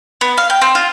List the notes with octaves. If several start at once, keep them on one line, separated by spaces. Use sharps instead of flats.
B3
F5
G5
C4
F4